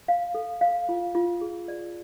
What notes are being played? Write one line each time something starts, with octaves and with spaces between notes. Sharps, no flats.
F5
A4
F5
F4
F4
G#4
D5